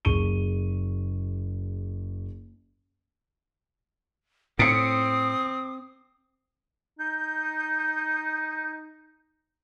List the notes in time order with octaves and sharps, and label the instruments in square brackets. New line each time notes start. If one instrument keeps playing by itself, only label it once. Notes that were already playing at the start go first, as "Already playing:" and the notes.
[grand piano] F#1 G#4 C#6 D#7 G7
[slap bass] A2 [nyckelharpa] C4 [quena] D#6 [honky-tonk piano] C#7 D7
[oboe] D#4 [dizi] G6